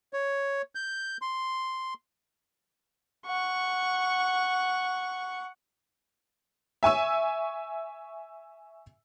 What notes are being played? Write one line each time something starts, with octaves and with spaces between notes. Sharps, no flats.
C#5
G6
C6
F#5 C#6
E5 G#5 C#6 E6